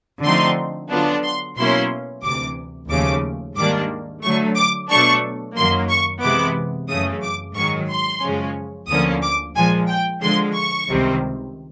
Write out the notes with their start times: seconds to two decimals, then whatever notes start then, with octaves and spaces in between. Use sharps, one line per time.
0.23 D3 F3 A3 C4 D#4 C6
0.90 D3 F#3 B3 D4 F4
1.23 C6
1.56 B2 F#3 A#3 C#4 E4 C6
2.23 D2 C3 E3 D6
2.90 D#2 C#3 F3 A3 D6
3.56 G#2 D#3 G3 A#3 D4 D6
4.23 D3 F#3 A3 C#6
4.56 D6
4.89 B2 F#3 A3 D4 C#6
5.56 F#2 D#3 F#3 A#3 C6
5.89 C#6
6.22 C3 E3 G#3 B3 E4 D6
6.89 F#2 C#3 E3 A3 D#6
7.22 D6
7.55 G#2 D#3 F#3 C#6
7.89 C6
8.22 F#2 C#3 F3 G#3 C#4
8.88 D2 D3 F3 A#3 C#4 D#6
9.22 D6
9.55 A#2 F3 G#3 G#5
9.89 G5
10.22 D3 F3 G#3 C6
10.55 C#6
10.88 C#2 C3 D#3 G3 C4